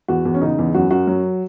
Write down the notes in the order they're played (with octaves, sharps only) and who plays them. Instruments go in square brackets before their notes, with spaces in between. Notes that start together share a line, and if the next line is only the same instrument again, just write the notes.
[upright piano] E2 F#4
E2
C#4
C#3 D#4
E2
F#2 F#4
F#2 F#4
F#3